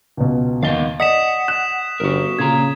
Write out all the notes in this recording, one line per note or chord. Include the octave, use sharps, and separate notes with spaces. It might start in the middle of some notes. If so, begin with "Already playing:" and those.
C#2 B2
D#2 B3 D#5 F5 A6 G7
D5 D#5 F#5 D#6 B6 E7
F#6 E7
G1 F#4 A#4
A#2 C#3 F4 A#5 G#6